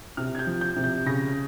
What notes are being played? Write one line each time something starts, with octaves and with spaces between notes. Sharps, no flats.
C3 F6
G#6
G6
F3
G6
C3
G6
C#3 A#6